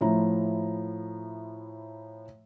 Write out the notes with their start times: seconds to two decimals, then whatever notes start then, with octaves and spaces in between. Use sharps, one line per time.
0.01 A2 F3 E4 A#5